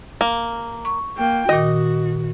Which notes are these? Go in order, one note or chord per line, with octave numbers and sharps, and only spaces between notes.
A#3
C#6
A#3 G5
A#2 D#3 F#4 D#5